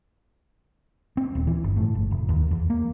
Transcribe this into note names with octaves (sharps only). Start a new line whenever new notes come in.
C4
D#1
E3
G1
A2
G1
F1
D#2
E2
A#3